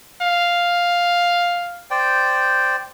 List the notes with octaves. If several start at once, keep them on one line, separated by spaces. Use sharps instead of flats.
F5
C5 D5 G5